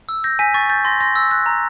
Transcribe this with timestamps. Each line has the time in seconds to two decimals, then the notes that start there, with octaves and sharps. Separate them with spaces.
0.09 E6
0.24 G6 A#6
0.39 G#5 B6
0.54 C#6 A6
0.70 G6 A6
0.85 C6 A#6
1.01 C6 A#6
1.16 E6
1.31 F#6
1.46 A#5